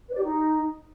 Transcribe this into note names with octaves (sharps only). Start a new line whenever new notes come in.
B4
D5
G4
D#4